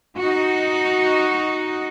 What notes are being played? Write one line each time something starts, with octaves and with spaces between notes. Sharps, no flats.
D#4 F#4